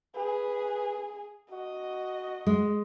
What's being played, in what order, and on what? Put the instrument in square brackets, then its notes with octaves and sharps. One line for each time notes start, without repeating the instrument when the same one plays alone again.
[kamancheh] G#4 [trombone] B4
[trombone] F#4 [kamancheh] D#5
[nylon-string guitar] G#3